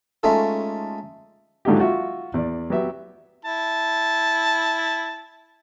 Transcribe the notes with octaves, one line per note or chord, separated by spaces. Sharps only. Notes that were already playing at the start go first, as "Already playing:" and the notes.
G#3 A3 C#4 D#4 F4 A4
G#2 D3 F#3 D#4 F4 G4
F4 F#4 E5
E2 D5
F#3 B3 G4 E5
E4 A5